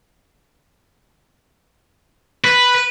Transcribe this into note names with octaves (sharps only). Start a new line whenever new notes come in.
B4